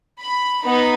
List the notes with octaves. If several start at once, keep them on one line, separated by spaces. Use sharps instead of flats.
B5
B3 D#4 B5